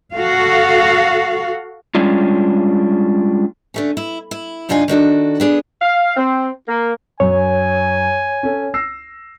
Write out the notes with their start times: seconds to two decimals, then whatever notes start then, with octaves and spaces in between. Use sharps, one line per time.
0.14 F#4 A4 F5
1.95 G3 G#3 C#4 D4 F4
3.74 D3 A3 C#4
3.97 E4
4.31 E4
4.69 F#2 C3 D4 D#4 F4 G#5
4.88 D#3 D4 F#4 A4
5.40 B3 D4 G#4
5.82 F5
6.17 C4
6.68 A#3
7.20 F#2 C#5 G#5
8.43 C#4 A4
8.74 E6 A#6 C7